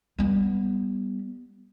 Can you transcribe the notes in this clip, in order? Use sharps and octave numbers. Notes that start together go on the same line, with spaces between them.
G3 B3